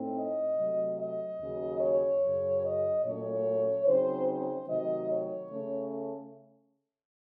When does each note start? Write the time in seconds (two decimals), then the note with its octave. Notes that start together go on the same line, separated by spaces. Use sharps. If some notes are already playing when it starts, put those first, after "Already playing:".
Already playing: A2 A3 C4 D#4
0.16 D#5
0.58 C3 F#3 A3
0.99 D#5
1.40 D#2 C#3 F#3
1.81 C#5
2.22 F#2 C#3 F#3
2.63 D#5
3.04 A#2 F#3 A3 C#4 C#5
3.86 C#3 F#3 C4 D#4 C5
4.28 C5
4.68 C3 D#3 F#3 A3 D#4 D#5
5.10 C#5
5.51 C#3 A3 C#4